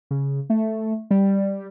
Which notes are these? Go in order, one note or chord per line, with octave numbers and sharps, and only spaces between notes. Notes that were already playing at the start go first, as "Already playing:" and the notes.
C#3
A3
G3